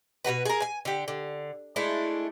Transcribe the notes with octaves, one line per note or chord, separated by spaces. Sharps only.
B2 F#3 F#4 B4
G#4 A#4
G#5
D3 G4
D3
G#3 A3 D4 E4